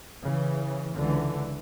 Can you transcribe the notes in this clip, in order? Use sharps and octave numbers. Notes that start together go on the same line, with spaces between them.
C#3 E3
C#2 D3 E3